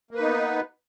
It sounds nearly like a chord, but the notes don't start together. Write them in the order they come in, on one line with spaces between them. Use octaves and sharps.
A#3 B4 D#4 B3